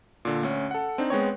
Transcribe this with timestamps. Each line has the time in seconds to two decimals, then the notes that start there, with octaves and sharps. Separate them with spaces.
0.25 A#2 D3
0.43 D2 C#4
0.71 A4 F#5
0.98 C4 D4 D#4
1.10 G#3 B3 C4 C#5